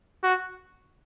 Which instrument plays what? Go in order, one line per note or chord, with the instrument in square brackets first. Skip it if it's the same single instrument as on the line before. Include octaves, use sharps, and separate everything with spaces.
[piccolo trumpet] F#4